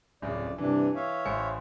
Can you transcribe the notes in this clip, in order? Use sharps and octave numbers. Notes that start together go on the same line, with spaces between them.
D1 F2 C#3 D5
G2 C3 E3 D4
C#5 E5 F5
A1 C5 C#7